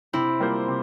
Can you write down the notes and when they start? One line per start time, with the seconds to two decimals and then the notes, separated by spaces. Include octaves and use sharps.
0.13 C3 C4 E4
0.40 G3 A#3 F4 C5
0.68 C3